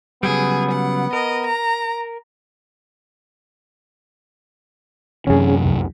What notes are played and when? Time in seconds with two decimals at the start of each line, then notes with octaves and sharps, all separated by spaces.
0.23 C#3 F#3 G3 B3 G#4
0.71 F#5
1.13 A#4 D#5
1.46 A#5
5.27 F#2 C3 E3 C#4 G#4
5.64 C2 F2